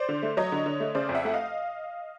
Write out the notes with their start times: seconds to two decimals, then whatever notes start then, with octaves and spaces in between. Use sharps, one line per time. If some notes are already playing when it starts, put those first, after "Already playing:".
Already playing: C5 D5
0.09 D3
0.23 A3
0.37 F#3 C#5 D#5
0.52 D3
0.66 D3
0.80 A3
0.95 C#3 C5 D5
1.09 F2
1.15 E5 F#5
1.25 A3 F#5
1.33 D#5 F5